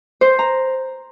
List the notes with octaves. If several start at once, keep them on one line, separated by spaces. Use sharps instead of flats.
C5
A#5